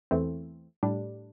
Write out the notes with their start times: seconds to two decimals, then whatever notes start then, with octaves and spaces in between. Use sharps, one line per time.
0.11 E2 E3 A3 C4
0.83 A2 G3 D4